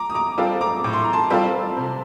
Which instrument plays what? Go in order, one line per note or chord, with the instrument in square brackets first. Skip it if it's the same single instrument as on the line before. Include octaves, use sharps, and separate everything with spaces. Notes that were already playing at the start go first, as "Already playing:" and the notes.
Already playing: [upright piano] A#5 D6
D#6
A#5 D6
[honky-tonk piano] G3 C4 F4 A4
[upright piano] A#5 D6
[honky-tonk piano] A2 [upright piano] D6
[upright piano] C6
A#5
A5 C6
[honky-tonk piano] G3 C4 F4 A4
C3